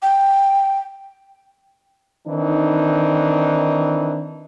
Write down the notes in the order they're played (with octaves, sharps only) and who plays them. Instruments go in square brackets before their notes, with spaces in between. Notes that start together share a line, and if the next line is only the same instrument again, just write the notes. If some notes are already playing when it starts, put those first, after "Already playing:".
[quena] G5
[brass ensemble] D#3 E3 C4 D4 D#4